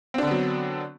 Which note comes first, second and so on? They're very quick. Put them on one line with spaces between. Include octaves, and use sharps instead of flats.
C4 D4 D3 B3 F#3